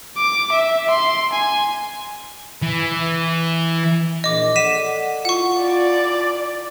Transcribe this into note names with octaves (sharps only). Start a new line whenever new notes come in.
D6
E5
C6
G#5
E3
A#1 D#5 D6
A4 D5 F#5 B6 D#7 E7
E4 F4 F#5 C#6
D5